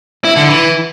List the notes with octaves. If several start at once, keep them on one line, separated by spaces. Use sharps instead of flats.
E4
D3
E3